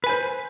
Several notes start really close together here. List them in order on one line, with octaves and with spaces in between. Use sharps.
B4 G#5 C5